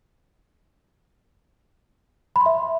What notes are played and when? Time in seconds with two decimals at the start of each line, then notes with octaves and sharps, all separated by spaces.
2.36 B5
2.41 C6
2.46 E5